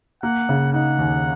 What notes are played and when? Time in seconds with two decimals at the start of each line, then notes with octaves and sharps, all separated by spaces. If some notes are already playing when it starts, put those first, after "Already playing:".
0.22 A#3 F#5
0.49 C#3
0.73 D#4 F#5
0.99 D#2